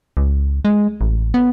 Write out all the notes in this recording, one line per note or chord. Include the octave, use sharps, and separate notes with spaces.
C#2
G#3
A1
B3